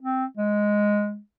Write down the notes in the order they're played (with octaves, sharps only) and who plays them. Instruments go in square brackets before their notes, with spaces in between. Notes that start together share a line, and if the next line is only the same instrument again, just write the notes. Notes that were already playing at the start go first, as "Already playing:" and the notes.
[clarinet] C4
G#3